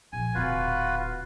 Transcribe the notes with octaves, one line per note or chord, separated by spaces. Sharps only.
A#1 G#5
D1 F4 F#4 B4